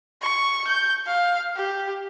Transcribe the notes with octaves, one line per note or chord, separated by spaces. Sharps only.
C#6
G6
F5
G4